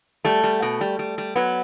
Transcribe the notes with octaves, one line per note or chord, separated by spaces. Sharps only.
G3 A3
G3
B2
G3
G3
G3
F#3 B3